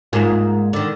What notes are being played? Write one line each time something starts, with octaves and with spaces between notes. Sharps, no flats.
G#2 A#3 F4
D3 D#3